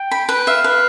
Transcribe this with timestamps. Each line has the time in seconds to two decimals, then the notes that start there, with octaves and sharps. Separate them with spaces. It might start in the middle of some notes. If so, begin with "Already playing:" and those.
Already playing: G5
0.11 B5
0.29 B4
0.47 E5 F5
0.64 B4